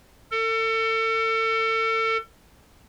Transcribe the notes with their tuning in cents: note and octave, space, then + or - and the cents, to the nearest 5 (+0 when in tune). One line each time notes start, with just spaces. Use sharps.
A4 +35